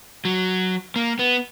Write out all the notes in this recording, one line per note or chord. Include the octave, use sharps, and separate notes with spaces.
F#3
A#3
B3